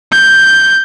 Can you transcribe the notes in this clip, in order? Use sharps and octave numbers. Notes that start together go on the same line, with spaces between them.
G6